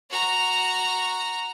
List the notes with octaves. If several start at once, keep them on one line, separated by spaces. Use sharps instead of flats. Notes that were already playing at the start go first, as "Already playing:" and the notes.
F#4 A#5